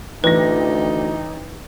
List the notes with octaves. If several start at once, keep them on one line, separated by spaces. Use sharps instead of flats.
A1 D2 D#4 B4 A#6